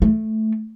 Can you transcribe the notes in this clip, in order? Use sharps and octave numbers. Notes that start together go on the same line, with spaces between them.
A3